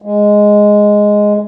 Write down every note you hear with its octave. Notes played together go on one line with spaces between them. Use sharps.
G#3